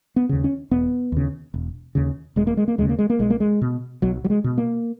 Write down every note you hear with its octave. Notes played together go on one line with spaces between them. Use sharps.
B3
D#2 C#3
C#4
E1 B3
D#2 C#3
E1
D#2 C#3
E1 G#3
A#3
G#3
A#3
D#2 C#3 G#3
A#3
G#3
A#3
B1 G#3
A#3
G#3
B2
B1 F#3
F#3
G#3
B2
A#3